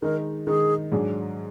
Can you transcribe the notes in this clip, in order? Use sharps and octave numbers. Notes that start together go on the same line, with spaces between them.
D#3 G#3 D#4 A#4
D#3 G#3 D#4 G#4
G#2 F#3 D4 G#4